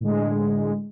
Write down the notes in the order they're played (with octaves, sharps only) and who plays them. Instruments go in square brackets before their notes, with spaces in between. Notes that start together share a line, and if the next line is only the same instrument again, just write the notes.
[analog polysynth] A2 D3 G#3